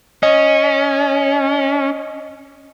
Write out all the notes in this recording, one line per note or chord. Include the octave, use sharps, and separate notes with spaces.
C#4 D#5